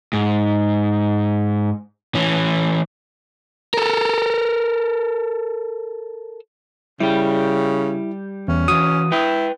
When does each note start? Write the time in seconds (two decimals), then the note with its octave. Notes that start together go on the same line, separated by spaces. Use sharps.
0.13 G#2
2.15 E3 C#4
3.74 A4 A#4
7.00 C#3 G3 E4 G4
8.48 E2 C#4
8.68 E3 F#4 D#6
9.12 E4 B4 G5